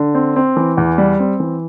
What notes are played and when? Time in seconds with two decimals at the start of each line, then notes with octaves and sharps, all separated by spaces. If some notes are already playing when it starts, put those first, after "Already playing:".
Already playing: D3
0.15 C4
0.36 C4
0.57 E3
0.77 E2
0.98 G3
1.20 C4
1.40 E3